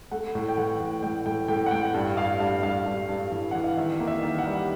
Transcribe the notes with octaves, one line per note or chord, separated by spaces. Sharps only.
A3 F#5
A2
G5
E3 F#5
A2
A2 G5
A2 G5
A2 G5
F#5
A2 G5
G2
G2 F5
G2 F5
G2 F5
G2
G2
E3
E3 F#5
F5
D#3 E5
A#3
E5
D#3
F#5
G3